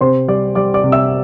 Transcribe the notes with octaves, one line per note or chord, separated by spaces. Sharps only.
C3 C5 C6
G3 D5 D6
G3 D5 D6
D5 D6
C3
E5 E6